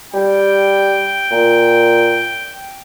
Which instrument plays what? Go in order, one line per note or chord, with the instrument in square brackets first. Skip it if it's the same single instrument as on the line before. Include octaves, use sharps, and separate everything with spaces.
[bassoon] G3 [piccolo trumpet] G5
[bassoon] A#2